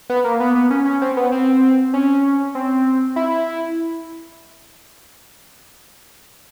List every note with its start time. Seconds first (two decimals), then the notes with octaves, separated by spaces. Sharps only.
0.10 B3
0.24 A#3
0.40 B3
0.55 B3
0.71 C#4
0.85 C#4
1.02 C4
1.17 B3
1.32 C4
1.94 C#4
2.55 C4
3.16 E4